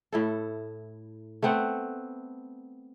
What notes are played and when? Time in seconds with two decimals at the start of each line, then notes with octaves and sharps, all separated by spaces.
0.12 A2 E4 A4
1.42 A3 B3 C4 F#5